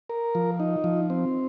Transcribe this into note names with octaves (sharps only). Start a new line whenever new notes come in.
A#4
F3
D#4
F3
C4